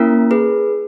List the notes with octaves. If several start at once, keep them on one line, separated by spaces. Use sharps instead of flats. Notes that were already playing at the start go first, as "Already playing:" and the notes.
Already playing: A#3 C#4 E4 A#4
G#4 B4